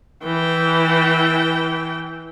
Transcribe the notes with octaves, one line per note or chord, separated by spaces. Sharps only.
E3 G5